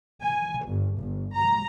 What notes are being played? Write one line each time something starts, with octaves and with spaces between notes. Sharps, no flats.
G#5
G1
G1
A#5